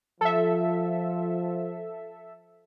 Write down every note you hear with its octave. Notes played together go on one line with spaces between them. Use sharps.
F3 A4 E5